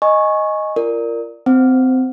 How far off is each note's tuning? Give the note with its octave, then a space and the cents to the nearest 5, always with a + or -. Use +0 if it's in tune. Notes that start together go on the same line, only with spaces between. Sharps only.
D#5 +0 G#5 +0 C#6 -10
F4 -30 A#4 -10 D5 +0
C4 -25 C5 +0 F#5 +0